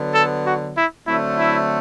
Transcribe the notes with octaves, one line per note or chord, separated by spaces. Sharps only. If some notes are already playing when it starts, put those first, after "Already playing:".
Already playing: D3 F#3 B3
A4
F#4
E4
D3 F#3 A3 C4 E4
E4